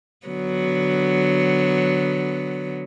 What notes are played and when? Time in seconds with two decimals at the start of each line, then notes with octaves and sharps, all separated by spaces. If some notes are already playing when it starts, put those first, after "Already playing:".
0.26 D3 F#3 B3